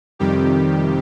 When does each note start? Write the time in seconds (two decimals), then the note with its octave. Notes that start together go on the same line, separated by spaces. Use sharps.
0.19 F2 C3 D#3 G3 G4